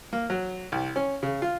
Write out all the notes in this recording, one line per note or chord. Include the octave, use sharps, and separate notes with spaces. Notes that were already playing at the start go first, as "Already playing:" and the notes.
A#3
F#3
C2
C#4
C#3
F4